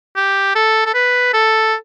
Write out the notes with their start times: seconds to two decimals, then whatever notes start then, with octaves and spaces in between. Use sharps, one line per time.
0.16 G4
0.55 A4
0.86 A4
0.94 B4
1.34 A4